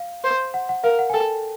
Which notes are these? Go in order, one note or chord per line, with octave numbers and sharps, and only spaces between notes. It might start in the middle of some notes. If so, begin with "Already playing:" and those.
Already playing: F5
C5
F#5
F#5
A#4 F5
F#5
G#5
A4 G5